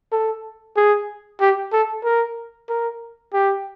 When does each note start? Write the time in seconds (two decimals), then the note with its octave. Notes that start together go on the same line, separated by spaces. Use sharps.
0.12 A4
0.77 G#4
1.41 G4
1.73 A4
2.04 A#4
2.69 A#4
3.33 G4